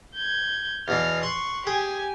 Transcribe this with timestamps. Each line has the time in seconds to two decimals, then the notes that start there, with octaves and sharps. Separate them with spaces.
0.15 G6 G#6
0.88 E2 B2 E3 F6
1.23 C6 C#6 F#6
1.67 G4 G#4 G#5